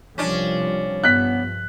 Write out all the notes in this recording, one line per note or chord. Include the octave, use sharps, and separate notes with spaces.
C2 F3 G3 C#4 D4
G2 F3 B3 F#6 B6